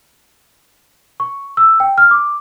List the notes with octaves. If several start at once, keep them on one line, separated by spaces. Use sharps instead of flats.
C#6
E6
G5
F6
D6